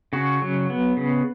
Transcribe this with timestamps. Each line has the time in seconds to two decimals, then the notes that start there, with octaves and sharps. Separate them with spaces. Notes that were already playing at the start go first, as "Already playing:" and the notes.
0.13 C#3 F#4
0.42 F#3
0.70 B3
0.97 C#3